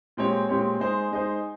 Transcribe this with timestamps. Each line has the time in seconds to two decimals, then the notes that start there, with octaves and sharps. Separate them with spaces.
0.17 A#2 G#3 C4 G4 C#5
0.49 A#2 G#3 C4 G4 C#5
0.80 G#3 D#4 G#4 C5
1.11 G#3 D#4 G#4 C5